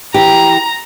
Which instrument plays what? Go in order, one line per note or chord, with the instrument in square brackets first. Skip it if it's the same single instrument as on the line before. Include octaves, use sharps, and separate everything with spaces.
[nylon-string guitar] E3 G4 [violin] A#5